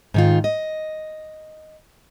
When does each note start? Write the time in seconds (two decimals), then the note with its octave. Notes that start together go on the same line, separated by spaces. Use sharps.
0.14 G#2 D#3 F4
0.44 D#5